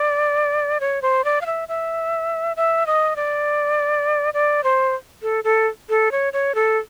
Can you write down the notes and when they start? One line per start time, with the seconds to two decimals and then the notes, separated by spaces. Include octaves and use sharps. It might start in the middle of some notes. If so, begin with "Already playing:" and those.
Already playing: D5
0.80 C#5
1.02 C5
1.25 D5
1.41 F5
1.46 E5
1.68 E5
2.57 E5
2.87 D#5
3.16 D5
4.34 D5
4.64 C5
5.23 A4
5.44 A4
5.89 A4
6.12 C#5
6.33 C#5
6.55 A4